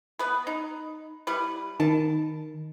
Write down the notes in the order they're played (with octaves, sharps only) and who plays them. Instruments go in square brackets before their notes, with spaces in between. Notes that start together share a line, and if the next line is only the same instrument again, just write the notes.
[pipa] B3 B4
D#4
G3 E4 B4
[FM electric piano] D#3 [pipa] A5